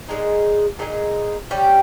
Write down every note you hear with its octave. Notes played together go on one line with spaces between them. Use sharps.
A#2 G#3 D#4 G#4
A#2 G#3 D#4 G#4
G3 C#4 G4